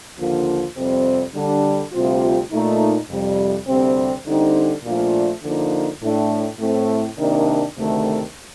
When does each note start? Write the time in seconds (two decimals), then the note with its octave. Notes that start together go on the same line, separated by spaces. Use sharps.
0.18 D#2 D3 F3 A#3 F4
0.76 F2 C3 G3 C4
1.34 D3 G3 D4
1.93 D2 C3 G3 C4 F4
2.51 A#2 A3 D#4
3.09 F2 C3 G3
3.67 D2 C3 G3 C4
4.26 D3 G3 C4 D#4
4.84 A#2 F3 A3 D4 F4
5.43 D3 F3 A#3 D#4
6.01 A2 A3 D4
6.59 A2 A3 C4
7.17 C3 D#3 A#3 D4
7.76 D2 C3 D#3 A3